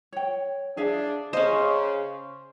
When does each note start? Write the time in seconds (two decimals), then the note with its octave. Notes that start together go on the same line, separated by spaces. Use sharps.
0.12 C#5 G5
0.77 D4 G#4 E5 F5
1.33 C#3 C#4 C5 D#5